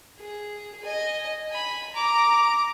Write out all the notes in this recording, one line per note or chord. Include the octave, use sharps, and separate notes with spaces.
G#4
D#5 G#5
G#5 B5
A#5 D6